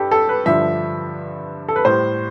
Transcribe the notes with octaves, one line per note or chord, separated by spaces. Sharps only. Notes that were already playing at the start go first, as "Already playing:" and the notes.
Already playing: G2 G4 A4
A4
B4
G2 D3 F3 E5
A4
B4
A2 G3 C5